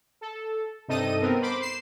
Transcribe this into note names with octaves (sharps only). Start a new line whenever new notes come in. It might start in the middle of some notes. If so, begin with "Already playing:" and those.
A4
G2 C3 D#4 A4 D#5 D#7
B3 C4 A#4
C5 B5 C6 D6
C7 E7